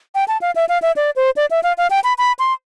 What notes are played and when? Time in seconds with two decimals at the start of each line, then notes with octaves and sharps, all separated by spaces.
0.15 G5
0.28 A5
0.42 F5
0.56 E5
0.69 F5
0.82 E5
0.96 D5
1.16 C5
1.36 D5
1.51 E5
1.63 F5
1.78 F5
1.90 G5
2.04 B5
2.18 B5
2.39 C6